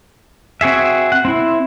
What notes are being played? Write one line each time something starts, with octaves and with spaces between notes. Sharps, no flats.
C4 F#4 G#4 E5
F#5
C4 E4